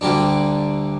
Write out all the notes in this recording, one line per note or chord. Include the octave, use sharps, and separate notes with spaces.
D2 D3 G3 A#3 D4